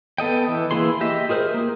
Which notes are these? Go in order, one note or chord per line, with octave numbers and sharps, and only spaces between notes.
B3 A4 D#5 G5
E3
E3 A#3 E4 G#4 C6
G4 D#5 E5
F4 G#4 A#4 C5
A#3